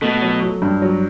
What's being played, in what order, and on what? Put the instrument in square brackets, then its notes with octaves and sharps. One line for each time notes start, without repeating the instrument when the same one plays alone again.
[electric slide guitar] B2 [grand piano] A3
[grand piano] F#3
F#3
G2
F#3